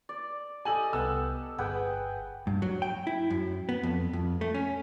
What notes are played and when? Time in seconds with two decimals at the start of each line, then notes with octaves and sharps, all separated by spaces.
0.09 D5
0.65 G4 A4 D#5 G#5 F#7
0.93 C2 B3 A4 F#5 E6
1.58 G1 G#4 B4 F#5 G5
2.47 G2
2.62 F#3
2.82 G5
3.07 E4
3.30 F#2
3.69 B3
3.83 F2
4.13 F2
4.41 A3
4.54 C#4